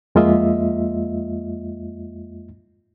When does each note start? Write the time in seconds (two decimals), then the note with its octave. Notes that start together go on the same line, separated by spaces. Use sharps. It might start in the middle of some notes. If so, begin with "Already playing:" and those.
0.15 F2 G#3 A#3 F4 D#5 E5